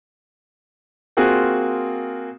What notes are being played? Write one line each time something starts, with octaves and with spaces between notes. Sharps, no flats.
A#3 C4 F4 F#4 G#4